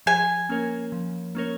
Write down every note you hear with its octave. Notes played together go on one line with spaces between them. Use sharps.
F3 G#5
A#3 C#4 A#4 C#5
F3
A#3 C#4 A#4 C#5